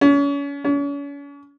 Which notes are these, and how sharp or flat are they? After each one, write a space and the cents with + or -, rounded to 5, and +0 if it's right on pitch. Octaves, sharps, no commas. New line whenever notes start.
C#4 +35
C#4 +40